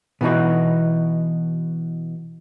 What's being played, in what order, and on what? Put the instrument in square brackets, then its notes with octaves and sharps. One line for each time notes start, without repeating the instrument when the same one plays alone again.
[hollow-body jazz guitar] B2 E3 D#4 F#4